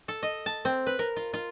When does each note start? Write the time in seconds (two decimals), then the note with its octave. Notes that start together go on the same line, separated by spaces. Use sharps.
0.08 A4
0.23 D#5
0.46 A5
0.65 C4
0.87 B4
0.99 A#4
1.16 F4
1.34 F4